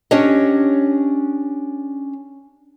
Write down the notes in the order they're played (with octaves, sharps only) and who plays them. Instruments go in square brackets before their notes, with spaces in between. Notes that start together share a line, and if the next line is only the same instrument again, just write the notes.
[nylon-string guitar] C#4 D4 G4 C#5 D#5